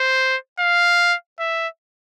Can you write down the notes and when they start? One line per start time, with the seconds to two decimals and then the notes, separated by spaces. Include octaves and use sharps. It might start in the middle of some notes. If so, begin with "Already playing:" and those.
Already playing: C5
0.59 F5
1.40 E5